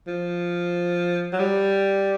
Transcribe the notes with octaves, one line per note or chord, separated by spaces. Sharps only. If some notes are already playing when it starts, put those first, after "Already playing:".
F3
F#3
G3